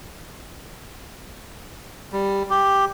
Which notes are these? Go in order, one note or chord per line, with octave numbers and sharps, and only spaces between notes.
G3
G4